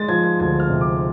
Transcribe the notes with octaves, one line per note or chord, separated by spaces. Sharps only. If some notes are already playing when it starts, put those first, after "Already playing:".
Already playing: G#3 A6
F3 G#6
G#6
D2 G#6
F6
C3
D6